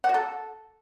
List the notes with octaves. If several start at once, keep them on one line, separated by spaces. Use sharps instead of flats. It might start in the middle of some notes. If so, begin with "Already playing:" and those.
F#5
F#4
A4